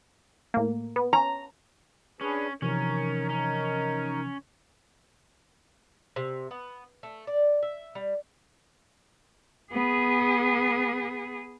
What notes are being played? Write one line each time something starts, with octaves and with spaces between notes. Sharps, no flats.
A2 A#3
B3
C#4 A#5
C#4 D4 G#4 B4
C3 E3 F3 C#4 D#4 A#4
C#4
C3
B3
A3
D5
E5
G3
B3 G#4